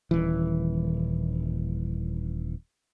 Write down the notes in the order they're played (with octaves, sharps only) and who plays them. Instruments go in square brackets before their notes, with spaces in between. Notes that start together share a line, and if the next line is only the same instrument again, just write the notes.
[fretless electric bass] D#1 E3